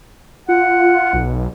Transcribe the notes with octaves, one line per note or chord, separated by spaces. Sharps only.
F4 F#5
B1